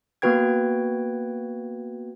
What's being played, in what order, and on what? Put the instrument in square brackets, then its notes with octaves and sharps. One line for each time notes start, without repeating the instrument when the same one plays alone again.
[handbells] A#3 B3 F#4 B4 G5 G#6